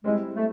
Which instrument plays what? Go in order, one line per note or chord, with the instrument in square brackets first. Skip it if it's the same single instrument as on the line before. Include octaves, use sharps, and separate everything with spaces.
[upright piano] G3 C4 E4 [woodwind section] G#3
[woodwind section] A3